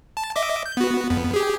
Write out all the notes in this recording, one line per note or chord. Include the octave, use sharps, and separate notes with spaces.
A5
D#5 E5 D6
G6
B3 F#4
F2 B3
G4 G#4